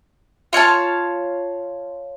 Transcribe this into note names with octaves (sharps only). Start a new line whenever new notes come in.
F4 C#5 F5 A5